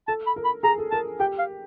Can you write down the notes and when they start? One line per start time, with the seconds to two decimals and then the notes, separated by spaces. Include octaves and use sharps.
0.08 A4 A5
0.27 B5
0.36 A#4
0.45 B5
0.63 G#4 A#5
0.78 A4
0.91 A#4 A5
1.20 G4 G5
1.39 F5